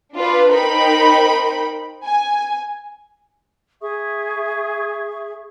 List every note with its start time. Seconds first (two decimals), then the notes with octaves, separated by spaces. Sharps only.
0.15 D4 F4 B4
0.50 D#4 A#4 C5 G5 B5
2.06 G#5
3.82 G#4 E5 C#6 D#6